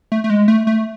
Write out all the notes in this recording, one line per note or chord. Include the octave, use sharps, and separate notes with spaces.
A3
A3
G#3
A3
A3